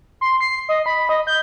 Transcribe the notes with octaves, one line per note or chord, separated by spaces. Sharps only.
C6
C7
D#5
B5
D#5
G6